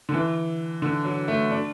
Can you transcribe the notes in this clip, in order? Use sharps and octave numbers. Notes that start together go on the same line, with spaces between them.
D3
E3
D3
F#3
A3
D4